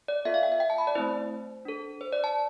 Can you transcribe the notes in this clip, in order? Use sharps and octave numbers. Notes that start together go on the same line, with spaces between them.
D5
B3 F4 A4 E5
F5
G5
E5
G5
A5
B5
D5
A3 C4 E4 C5
D4 A4
C5
D5
A5